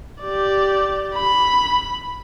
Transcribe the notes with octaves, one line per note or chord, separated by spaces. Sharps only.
G4 D5
B5